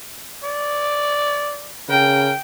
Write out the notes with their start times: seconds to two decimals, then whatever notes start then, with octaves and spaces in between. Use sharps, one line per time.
0.44 D5
1.89 C#3 A#4 G5